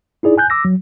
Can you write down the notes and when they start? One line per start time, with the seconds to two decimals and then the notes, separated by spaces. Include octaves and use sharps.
0.23 D#4 E4 G#4 D5
0.38 G#5 F#6 G6
0.50 D6 E6 A#6
0.65 F#3